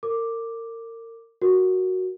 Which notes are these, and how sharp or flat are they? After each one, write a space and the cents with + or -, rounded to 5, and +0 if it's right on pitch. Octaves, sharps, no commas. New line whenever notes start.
A#4 -35 D6 +0
F#4 +0 A#4 +0